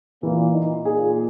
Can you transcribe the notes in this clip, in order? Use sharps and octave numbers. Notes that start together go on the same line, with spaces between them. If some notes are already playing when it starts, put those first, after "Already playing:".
A#2 E3
D#4
A#2 G#4